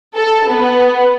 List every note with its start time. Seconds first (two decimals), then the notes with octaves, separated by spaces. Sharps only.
0.15 A4
0.49 B3